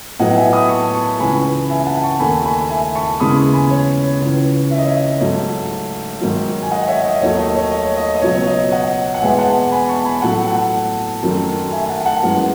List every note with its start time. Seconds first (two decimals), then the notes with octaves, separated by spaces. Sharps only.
0.19 A2 F#3 B3 D#5 F#5
0.36 E5 G#5
0.53 B5 D#6
0.69 A5 C#6
0.94 A5 C#6
1.19 C#2 C#3 E3 G#5 B5
1.70 E5 G#5
1.86 F#5 A5
2.03 A5 C#6
2.20 D#2 D#3 A3 G#5 B5
2.45 G#5 B5
2.70 E5 G#5
2.95 A5 C#6
3.20 D#2 C#3 E3 G#3 B3 B5 D#6
3.54 G#5 B5
3.70 C#5
4.21 C#2 C#3 E3
4.71 E5
4.78 D#5
4.85 C#5 E5
5.21 G#2 F#3 A3
6.21 G#2 D#3 F#3
6.63 G#5
6.71 D#5 F#5
6.88 C#5 E5
7.05 D#5
7.21 D#2 D#3 F#3 A3 C#5
7.38 D#5
7.55 C#5
7.72 D#5
7.85 C#5
7.97 D#5
8.16 D#5
8.21 C#2 B2 F#3 C#5
8.35 C#5
8.47 D#5
8.71 D#5 F#5
9.14 F#5
9.22 E2 B2 G#3 B3 E5 G#5
9.38 F#5 A5
9.72 G#5 B5
9.88 A5 C#6
10.05 G#5 B5
10.22 A2 F#3 A3 F#5 A5
10.47 F#5 A5
11.22 F#2 D#3 F#3 A3
11.72 E5 G#5
11.89 F#5 A5
12.06 F#5 A5
12.23 F#2 E3 G#3